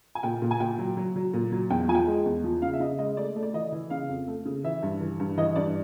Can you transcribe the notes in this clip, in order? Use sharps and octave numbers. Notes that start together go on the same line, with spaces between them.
G#5
A#2 G5
A#2
G#5
A#2 G5
F#3
F#3
F#3
A#2
F#3
E2 G5
F3 G#5
G5
G#3
E2
F3
C#3 F5
E5
C#3 D#5
G#3 D#5
A3 D5
A3
D5
E3 D#5
E3
C#3 F5
F2
A3
C#3
E3 E5
G2
E3
G2
E3 D#5
G2 D5